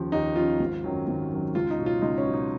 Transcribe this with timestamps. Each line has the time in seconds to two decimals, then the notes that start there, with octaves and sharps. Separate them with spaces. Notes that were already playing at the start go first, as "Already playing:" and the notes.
Already playing: D#2 C#3 F3
0.12 D#2 D#4
0.36 C#3 F3 F4
0.60 G#1
0.84 F#2 D#3 F#3
1.08 G#1
1.31 F#2 D#3 F#3
1.55 C#2 F4
1.70 D#4
1.78 B2 F#3
1.86 F4
2.02 C#2 D#4
2.18 C#4
2.26 B2 F#3
2.33 D#4